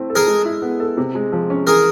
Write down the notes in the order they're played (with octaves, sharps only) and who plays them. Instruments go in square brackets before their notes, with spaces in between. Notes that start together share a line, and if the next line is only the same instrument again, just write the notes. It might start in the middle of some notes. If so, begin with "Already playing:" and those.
Already playing: [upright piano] A3 C4 E4
A4
[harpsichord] G#4 A#4
[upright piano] G#3
E4
B3
A4
C3
G#3
F3
C#4
[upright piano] E3 [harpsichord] G#4 A#4